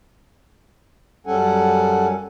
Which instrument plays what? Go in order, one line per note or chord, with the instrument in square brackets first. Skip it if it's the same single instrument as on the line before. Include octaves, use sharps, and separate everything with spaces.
[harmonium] F#2 G3 C#4 A4 F#5 G#5